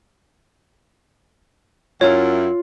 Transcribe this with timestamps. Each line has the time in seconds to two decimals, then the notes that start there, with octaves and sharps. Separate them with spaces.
2.01 F#2 E4 F4 C#5